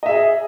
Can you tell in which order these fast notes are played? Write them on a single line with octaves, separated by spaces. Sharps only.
D#5 E5 G#4